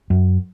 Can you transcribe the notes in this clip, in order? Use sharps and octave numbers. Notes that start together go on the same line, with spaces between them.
F#2